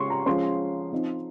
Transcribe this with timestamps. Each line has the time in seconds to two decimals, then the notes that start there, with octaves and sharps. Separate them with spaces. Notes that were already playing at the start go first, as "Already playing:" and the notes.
Already playing: C#3 G#3 C#4 C6 C#6
0.10 A#5
0.26 F3 G#3 C#4 C6
0.93 F3 C4 D#4